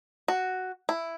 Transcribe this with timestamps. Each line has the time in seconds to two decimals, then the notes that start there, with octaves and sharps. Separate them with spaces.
0.28 F#4
0.89 E4